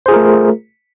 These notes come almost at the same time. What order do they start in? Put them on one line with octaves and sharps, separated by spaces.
C5 G#4 F4 A#4 A3